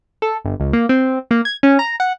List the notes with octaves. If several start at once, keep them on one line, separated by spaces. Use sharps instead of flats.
A4
G1
C#2
A#3
C4
A#3
G#6
C#4
A#5
F#5